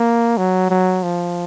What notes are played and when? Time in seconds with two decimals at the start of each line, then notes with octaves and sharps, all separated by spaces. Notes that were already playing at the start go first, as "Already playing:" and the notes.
Already playing: A#3
0.37 F#3
0.70 F#3
1.03 F3